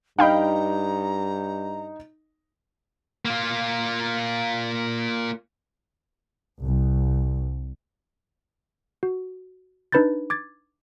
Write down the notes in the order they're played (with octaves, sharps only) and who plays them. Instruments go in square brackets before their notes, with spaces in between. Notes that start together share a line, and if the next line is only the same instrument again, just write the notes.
[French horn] G2 [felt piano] D#4 D#5 [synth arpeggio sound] F5 G5 B5 [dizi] A#5
[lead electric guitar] A#3 F4
[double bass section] C2
[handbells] F#4
D4 D#4 B4 B5 G6 A6
D6 G#6 A6